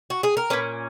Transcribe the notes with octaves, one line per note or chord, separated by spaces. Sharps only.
F#4
G#4
A#4
A#2 A#3 C#4 B4